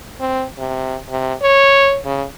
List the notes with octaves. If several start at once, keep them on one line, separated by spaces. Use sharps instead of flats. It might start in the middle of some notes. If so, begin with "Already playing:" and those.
C4
C3
C3
C#5
C#3